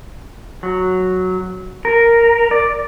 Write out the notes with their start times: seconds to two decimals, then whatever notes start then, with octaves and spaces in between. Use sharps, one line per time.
0.63 F#3
1.85 A#4
2.51 D5